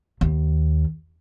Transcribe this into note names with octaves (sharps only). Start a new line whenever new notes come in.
D#2